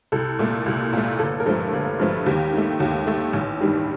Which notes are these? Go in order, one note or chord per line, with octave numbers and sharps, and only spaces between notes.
C2 A4
A#2 A3
C2
A#2 A3
G1 A4
A#4
G2 F3 A3 A4
G1
G2 F3 A3
D#2 G4
D#3 A3
D#2
D#3 A3
A1
G2 D#3 G3